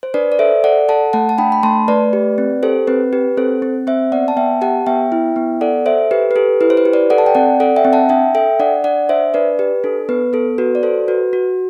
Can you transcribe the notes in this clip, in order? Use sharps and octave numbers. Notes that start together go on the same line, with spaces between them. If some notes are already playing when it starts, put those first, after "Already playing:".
C5
D4 B4 D5
D5
A4 C5 E5
A4 D5 F#5
A4 F#5 A5
A3 F#5 A5
A5
D4 G5 B5
B5
A3 A5 C6
A3 B4 D5
G4
C4
G4 A4 C5
C4 B4
G4 B4
C4 A4 C5
C4
C4 C5 E5
B3 D5 F#5
A5
B3 E5 G5
G4 F#5 A5
B3 E5 G5
E4
B3
A4 D5 F#5
A4 C5 E5
G4 B4
B4
G4 A4
E4 B4
C5
B4
G4
B4 D5
A4 D5 F#5
A5
G5
C4 D5 F#5
A4 D5 F#5
E5 G5
C4
F#5 A5
D4 E5 G5
A4 E5 G5
D4 D5 F#5
D4 D5 F#5
D4 C5 E5
D4 B4 D5
G4 B4
D4 A4
B3 B4
B3 A4
F#4 B4
D5
A4 C5
F#4 B4
F#4